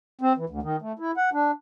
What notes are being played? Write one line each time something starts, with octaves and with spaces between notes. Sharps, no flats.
C4
E3
D2
D#3
A3
E4
F#5
D4